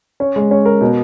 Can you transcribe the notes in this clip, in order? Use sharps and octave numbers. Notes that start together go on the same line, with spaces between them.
C#4
G#3
C#4
A#4
B2